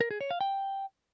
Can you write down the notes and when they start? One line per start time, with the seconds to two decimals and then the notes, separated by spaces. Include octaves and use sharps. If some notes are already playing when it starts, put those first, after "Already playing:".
0.01 A#4
0.11 G#4
0.21 C#5
0.31 F5
0.41 G5